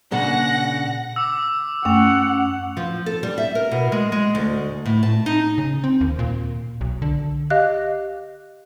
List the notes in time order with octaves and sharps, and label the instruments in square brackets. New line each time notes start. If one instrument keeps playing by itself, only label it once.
[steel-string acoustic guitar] A#2 C#3 D4 [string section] F#5 A#6
[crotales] D6 E6
[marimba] F#2 A3 [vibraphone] C#4 [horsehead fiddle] F#5 [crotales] F7
[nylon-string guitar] F3
A4
G3
E5
A#4
B2
G#3
G#3
D2
A2
A5
D#4
[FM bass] C#3
C4
D#2
A#2
B1
D3
[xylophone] G4 D#5 F5 F#6